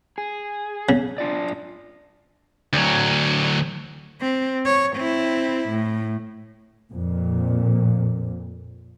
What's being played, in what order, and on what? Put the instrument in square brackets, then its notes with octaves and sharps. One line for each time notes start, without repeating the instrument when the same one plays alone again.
[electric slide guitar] G#4
[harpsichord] C#3
[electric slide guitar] D4 F4 D5
[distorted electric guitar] D2 F#3
[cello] C4
C#5
C4 E4
A2
[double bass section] F2 A#2